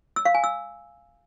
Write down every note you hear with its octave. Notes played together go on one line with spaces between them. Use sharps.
E6
F5
G#5
E6